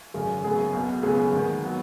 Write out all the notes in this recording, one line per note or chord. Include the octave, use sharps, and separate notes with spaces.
G#1 F#2 C#3
F#1 F#2 C#3 F#3 B3 G#4
B1 B2 B3
C#2 C#3 F#3 B3 G#4
G#4
D#2 D#3 G#3 B3
F#3 B3